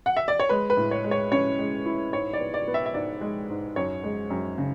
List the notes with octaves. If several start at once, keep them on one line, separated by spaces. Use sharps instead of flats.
F#5
E5
D5
C#5
G#3 B4
B4
A2
C#5
G#3
C#5
C#4 C#5
G#3
E4
G#2 C#5
D5
B3
D5
B3
E5
E5
G#2 D5
G#3
G#2
F#2 C#5
G#3
F#2
C#3